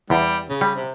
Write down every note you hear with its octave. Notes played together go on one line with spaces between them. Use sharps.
E2 G3
C#3
G3
C3